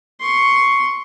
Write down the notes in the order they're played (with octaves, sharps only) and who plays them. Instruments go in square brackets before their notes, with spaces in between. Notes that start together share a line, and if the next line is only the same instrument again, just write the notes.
[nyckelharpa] C6 C#6